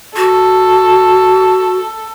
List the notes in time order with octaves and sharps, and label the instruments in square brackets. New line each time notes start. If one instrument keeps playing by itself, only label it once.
[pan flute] F#4 [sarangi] A4